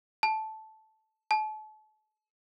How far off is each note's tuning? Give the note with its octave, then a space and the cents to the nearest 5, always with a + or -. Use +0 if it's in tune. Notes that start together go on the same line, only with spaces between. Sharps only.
A5 -10
A5 -35